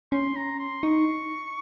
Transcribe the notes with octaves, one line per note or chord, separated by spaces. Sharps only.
C#4 C6
A#5
C6
D#4 C#6